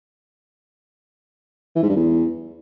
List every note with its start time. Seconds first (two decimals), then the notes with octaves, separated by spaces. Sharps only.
1.76 E3
1.83 G#2
1.89 G2
1.96 E2